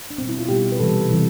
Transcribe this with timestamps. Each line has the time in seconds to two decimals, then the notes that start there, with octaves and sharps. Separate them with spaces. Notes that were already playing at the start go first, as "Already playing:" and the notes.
0.10 D4
0.18 B2 G3 C4
0.29 E4
0.39 F4
0.49 B2 G3 G4
0.72 B4
0.79 C3 E3 G3 A4
1.11 C3 E3 G3